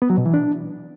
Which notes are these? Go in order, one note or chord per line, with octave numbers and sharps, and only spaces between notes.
B3
F#3
B2
E3
D4